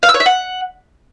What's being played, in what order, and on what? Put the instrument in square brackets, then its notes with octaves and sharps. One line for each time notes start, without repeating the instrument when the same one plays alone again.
[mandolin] F5
E6
C#5
E5
F#5